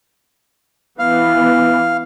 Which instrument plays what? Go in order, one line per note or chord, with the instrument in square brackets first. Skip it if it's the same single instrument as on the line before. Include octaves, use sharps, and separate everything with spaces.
[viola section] E3 B3 [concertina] F5